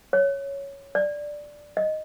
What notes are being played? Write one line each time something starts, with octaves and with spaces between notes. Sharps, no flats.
C#5
D5
D#5